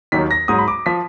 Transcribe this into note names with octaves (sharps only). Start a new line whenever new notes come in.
D#2 D#3 F#3 B6
A#6
G#2 F#3 D#6
B5
D6
F3 B6